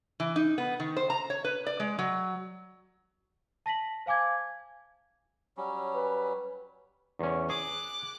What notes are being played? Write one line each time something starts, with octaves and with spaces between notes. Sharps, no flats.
E3
D#4
B3
D#3
C5
A#5
C#5
B4
D5
G#3
F#3
A5 A#6 B6 F#7
C5 F5 G#5 D6 G#6
F#3 G3 C#4
B4
E2 C#4
G#4 D6 F#6